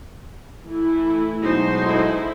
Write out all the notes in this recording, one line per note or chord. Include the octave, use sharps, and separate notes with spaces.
E3 A3 E4
B2 F#3 G#3 D#4 C5
E4 A4